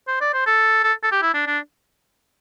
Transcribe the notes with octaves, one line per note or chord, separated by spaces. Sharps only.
C5
D5
C5
A4
A4
A4
G4
E4
D4
D4